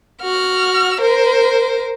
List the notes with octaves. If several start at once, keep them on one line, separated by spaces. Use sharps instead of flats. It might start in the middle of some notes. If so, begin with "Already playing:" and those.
F#4 F6
A#4 C5